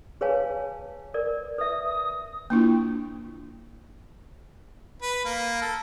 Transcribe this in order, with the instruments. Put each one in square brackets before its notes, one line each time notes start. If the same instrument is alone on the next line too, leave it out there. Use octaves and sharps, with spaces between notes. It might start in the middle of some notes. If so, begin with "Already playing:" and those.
[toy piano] G#4 B4 C#5 F5 G#5 A5
A#4 B4 D5
[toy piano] B4 E5 [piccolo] D#6
[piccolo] D#6
[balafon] A#3 D4 E4 F4
[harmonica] B4
A#3
A4